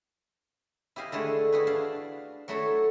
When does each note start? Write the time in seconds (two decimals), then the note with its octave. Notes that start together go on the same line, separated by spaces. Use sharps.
0.96 E4 G4 D#5 F5 G#5
1.12 D3 G#3 A3 E4
1.52 E4 F#4 G#4 B4
1.67 D4 F5 A5
2.48 F#3 A3 E4 A4 C#5